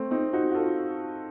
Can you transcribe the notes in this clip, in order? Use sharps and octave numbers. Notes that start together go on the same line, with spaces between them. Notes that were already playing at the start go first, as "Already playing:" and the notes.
Already playing: A3 C4
C4 D#4
D#4 F#4
F#4
F4 A4